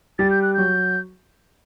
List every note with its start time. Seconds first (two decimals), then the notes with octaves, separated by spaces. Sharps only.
0.19 G3 G4 A6
0.30 G6
0.42 F#6
0.54 F#3 F#4 G6